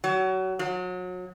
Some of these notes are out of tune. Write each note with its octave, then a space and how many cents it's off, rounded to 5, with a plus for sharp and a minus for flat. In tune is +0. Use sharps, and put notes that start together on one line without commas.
F#3 +25
F#3 -30